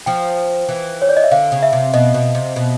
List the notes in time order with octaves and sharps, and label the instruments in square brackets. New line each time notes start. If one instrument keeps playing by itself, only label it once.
[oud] F3 [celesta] G5
[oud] E3
[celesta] C#5
D5
D#5
E5
[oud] D3 [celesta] F5
[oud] C#3
[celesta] E5
[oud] C3
[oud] B2 [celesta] D#5
[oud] B2
C3
B2